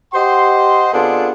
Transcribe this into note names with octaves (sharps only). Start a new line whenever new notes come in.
G4 C5 D#5 F#5 C6
C3 B3 D4 F4 G#4 A4